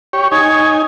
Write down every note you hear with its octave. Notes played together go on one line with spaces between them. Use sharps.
G4 C#5
D#4 C#5 G#5